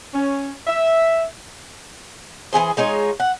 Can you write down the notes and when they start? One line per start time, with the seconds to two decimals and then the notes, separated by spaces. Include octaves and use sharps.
0.14 C#4
0.67 E5
2.53 E3 F#3 G#4 C5
2.77 G#3 D#4 F4 C#5
3.20 F#5